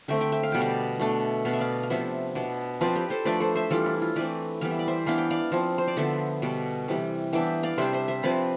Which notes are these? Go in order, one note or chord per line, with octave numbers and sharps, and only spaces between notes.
D3 A3 C4 E5 G5
E5 G5
E5 G5
F5
B2 G3 B3 G5
D5 F5
B2 A3 D4
B2 B3 D4 F5
E5
D5 F5
F5
C3 F3 B3 D4 C5 E5
B2 B3 D4
F3 C4 B4 D5
G4 B4
A4 C5
F3 A3 D4 B4 D5
A4 C5
C5 E5
E3 G3 D4 F4 A4
E4
F4
E3 A3 C4 B4 D5
E3 G3 B3 F5
E5
D5
C5 E5
E3 B3 D4 F5
G5
D5 F5
F3 C4
C5
D5
D3 F3 B3 C5 E5
B2 G3 D4
C3 E3 G3
E3 B3 D4 E5 G5
D5 F5
C3 G3 D4 C5 E5
C5 E5
C5 E5
C3 F3 C4 B4 D5